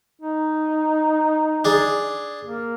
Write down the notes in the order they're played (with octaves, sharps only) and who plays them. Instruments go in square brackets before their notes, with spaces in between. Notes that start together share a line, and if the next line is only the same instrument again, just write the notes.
[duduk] D#4
[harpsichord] D4 G#4
[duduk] A#3